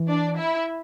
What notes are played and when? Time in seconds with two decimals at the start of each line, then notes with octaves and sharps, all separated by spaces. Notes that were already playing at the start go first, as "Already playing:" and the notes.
Already playing: E3
0.08 D4 D5
0.37 E4 E5